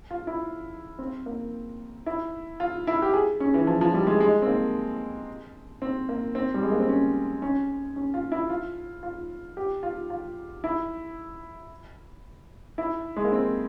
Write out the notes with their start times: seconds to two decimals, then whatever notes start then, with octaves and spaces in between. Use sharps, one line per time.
0.11 F4
0.27 E4
0.99 C4
1.26 A#3
2.06 E4
2.60 F4
2.87 E4
3.02 G4
3.13 G#4
3.40 C#4
3.54 E3
3.67 F3
3.81 F3
3.94 G3
4.07 G#3
4.20 G#3
4.42 C4
4.47 A#3
5.82 C4
6.09 A#3
6.35 C4
6.54 G3
6.63 G#3
6.72 A#3
6.80 C4
6.89 C#4
7.42 C#4
7.96 C#4
8.14 F4
8.32 E4
8.50 F4
9.03 F4
9.57 G4
9.83 F4
10.10 F4
10.64 E4
12.78 E4
13.16 G#3
13.25 A#3
13.32 C4